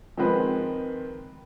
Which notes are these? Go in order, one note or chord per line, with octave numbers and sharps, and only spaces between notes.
D#3 F3 G#3 C4 B4